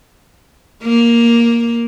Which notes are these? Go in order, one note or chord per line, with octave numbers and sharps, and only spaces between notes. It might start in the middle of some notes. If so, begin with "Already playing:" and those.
A#3